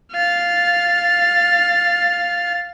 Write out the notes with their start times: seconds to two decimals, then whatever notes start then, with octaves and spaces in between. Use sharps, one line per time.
0.12 F5 A6